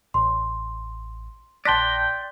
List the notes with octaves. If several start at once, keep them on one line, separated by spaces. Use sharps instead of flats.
A1 C6
A#1 D5 G5 A5 C6 F#6 A#6 B6